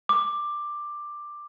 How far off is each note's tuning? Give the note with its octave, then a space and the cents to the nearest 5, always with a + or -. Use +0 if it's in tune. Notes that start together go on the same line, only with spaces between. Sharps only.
D6 +10